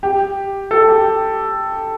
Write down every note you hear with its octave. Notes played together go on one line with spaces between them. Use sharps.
G4
A4
G4